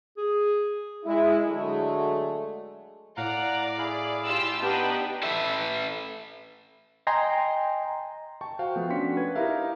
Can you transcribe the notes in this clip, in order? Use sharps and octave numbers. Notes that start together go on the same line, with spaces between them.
G#4
G#3 E4
D3 F#3 G#3 A3
A2 D5 F5 F#5 A#5
E4 G#4 F5
F4 G4 E6
B3 D4 D#4 G4 B4 G5
A4 B4 E5
D#5 G5 G#5 A#5 C6
G5 A5 C#6
F#4 C5 F5 G5
F3 A3 B3
C#4 D4 F#4 C6 B6 C#7
B4 G#6
D#4 E4 G4 A#4 E5 F5